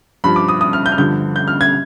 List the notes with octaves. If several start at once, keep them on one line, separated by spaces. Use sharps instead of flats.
G2 F3 B5
D6
D#6
D#6
F6
G6
F6
G2 D3 F3 G6
G6
F6
G#6